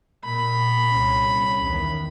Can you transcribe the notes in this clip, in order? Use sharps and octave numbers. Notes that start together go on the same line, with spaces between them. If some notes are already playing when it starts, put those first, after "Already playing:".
A#2 B5
C2 C#4
E2 D#3